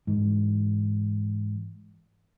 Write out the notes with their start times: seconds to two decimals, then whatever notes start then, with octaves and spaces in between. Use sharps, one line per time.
0.07 G#2 E3